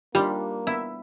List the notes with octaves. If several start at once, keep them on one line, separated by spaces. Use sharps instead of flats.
G3 A#3 D4 D#4 F4 G4
B3 E4 E5